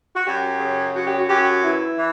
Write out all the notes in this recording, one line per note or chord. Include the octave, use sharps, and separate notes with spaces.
F#4
F#2 G4
C#3
F#2 F#4
G4
F#4
F#2 G4
F#4
E3 E4
E3